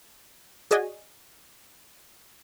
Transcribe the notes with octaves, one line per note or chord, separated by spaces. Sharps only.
F#4 G#4 D5 D#5 G#5